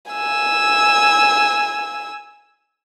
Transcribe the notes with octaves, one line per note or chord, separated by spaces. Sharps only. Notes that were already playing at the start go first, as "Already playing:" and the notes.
G#5 E6